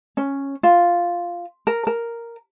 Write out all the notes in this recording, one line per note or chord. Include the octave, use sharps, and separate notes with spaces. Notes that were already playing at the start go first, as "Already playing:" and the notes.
C#4
F4
A#4
A#4